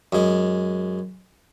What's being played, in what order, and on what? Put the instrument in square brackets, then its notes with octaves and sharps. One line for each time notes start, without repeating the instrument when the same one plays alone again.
[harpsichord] F#2 G#3